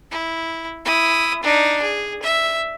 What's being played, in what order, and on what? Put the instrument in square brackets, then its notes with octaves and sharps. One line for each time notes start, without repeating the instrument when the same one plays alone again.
[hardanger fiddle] E4
E4 D#6
D4 D#4
G#4
E5